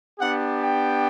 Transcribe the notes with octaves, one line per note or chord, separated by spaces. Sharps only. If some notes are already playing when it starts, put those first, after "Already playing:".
B3 D4 G4 F#5
G5